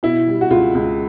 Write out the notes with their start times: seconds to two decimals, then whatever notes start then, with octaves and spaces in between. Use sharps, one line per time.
0.03 B2 E4
0.27 G3
0.41 F#4
0.50 C#2 F4
0.75 C#2